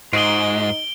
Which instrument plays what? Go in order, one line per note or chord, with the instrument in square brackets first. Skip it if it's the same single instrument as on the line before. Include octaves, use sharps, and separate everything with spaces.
[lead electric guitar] G#2 [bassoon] D#4 [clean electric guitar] F4 F#4 G#4 [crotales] D7 G7